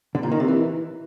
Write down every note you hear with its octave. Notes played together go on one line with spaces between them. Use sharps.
D3
A#2
D#3
C3
E3